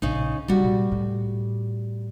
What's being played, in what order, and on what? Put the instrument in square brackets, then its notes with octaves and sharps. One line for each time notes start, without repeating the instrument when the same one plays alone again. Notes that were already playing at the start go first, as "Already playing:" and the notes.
[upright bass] A#1 [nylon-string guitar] C#3 D#4
[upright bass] C2 F#3 [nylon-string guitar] G3 F#4
[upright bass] A#2
A2